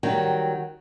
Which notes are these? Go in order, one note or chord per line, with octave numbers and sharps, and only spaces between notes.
D#3 F#3 G3